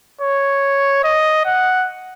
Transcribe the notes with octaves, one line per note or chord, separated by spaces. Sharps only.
C#5
D#5
F#5